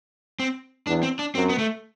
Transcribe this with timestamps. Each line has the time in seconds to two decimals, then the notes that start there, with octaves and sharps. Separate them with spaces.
0.39 C4
0.87 E2 D4
1.03 C4
1.19 D4
1.35 F#2 C4
1.49 B3
1.58 A3